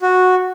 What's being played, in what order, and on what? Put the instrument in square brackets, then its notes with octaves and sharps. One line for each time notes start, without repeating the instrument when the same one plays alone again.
[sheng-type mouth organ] F#4